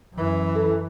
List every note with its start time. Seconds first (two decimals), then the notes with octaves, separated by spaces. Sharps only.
0.14 F#2 E3
0.55 A4